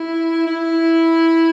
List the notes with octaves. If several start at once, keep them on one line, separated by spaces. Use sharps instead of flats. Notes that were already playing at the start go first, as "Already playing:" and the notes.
Already playing: E4
E4